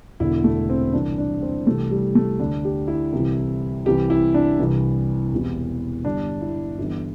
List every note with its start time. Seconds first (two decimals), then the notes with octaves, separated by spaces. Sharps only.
0.20 E1 E2 D3 E4
0.44 A3
0.70 C4
0.93 C2 C3 E3 D4
1.18 D4
1.42 C4
1.66 C2 C3 E3 A3
1.91 G3
2.15 A3
2.39 D2 D3 D4
2.64 G4
2.88 E4
3.12 C2 C3 E3
3.85 C2 C3 E3 G4
4.10 E4
4.34 D4
4.59 C2 C3 E3
5.33 E1 E2 C3 E3
6.05 G1 G2 D3 D4
6.42 E4
6.78 G1 G2 E3